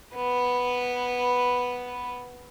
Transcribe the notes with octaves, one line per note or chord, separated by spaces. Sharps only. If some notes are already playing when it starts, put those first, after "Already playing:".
B3 B4